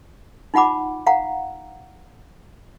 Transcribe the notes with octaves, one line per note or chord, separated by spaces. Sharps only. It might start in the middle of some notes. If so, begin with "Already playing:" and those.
D#4 F4 F#5 B5 D6
F5 F#5 A#5